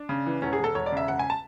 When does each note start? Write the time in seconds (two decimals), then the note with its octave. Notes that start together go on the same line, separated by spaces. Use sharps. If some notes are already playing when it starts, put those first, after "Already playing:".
Already playing: D4
0.09 C#3
0.26 E3
0.42 E1 C#4
0.53 G#4
0.59 E1 A4
0.75 E1 C#5
0.86 D5
0.92 C#3 E5
1.08 E1 F#5
1.19 G#5
1.30 A5